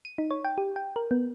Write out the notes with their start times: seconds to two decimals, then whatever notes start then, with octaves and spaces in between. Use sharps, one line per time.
0.05 D#7
0.18 D#4
0.31 C#5
0.44 G5
0.58 G4
0.76 G5
0.96 A#4
1.11 B3